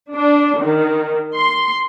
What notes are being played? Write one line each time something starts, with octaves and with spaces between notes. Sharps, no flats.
D4
D#3
C6